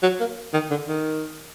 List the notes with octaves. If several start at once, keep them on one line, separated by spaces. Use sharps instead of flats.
F#3
A#3
D#3
D3
D#3